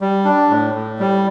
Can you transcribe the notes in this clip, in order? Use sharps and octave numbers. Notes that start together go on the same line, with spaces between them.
G3
D4
A2
A2
G3